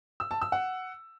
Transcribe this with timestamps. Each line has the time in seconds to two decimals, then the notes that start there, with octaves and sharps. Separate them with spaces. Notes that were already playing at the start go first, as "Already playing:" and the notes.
0.20 E6
0.31 A5
0.42 E6
0.52 F#5